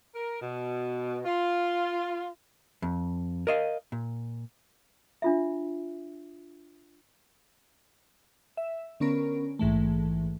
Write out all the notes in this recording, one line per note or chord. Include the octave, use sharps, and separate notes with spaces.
A#4
B2
F4
F2
A#4 D#5 F5
A#2
D4 F4 E5
E5
D3 B3 C#4 A#4 D7
A#1 G#2 E3 A3